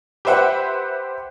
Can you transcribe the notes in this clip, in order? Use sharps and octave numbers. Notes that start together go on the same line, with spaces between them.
G4 B4 C5 E5 F#5